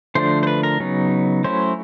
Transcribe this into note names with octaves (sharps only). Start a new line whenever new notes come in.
D3 F3 A3 D4 C5
C5
B4
A#4
C#3 F#3 B3 D#4
F#3 A3 C#4 E4 C5